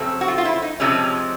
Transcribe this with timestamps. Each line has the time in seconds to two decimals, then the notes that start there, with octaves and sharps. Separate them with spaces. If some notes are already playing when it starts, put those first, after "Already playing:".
Already playing: F2 C#3 F#3 A3 C4
0.21 F#4
0.28 F4
0.38 F4
0.45 E4
0.62 D#4
0.80 F2 C3 F3 G#3 C4 C#4